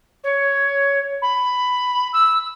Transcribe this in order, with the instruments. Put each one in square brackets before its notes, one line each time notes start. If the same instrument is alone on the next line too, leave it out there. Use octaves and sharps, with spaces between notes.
[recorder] C#5
B5
E6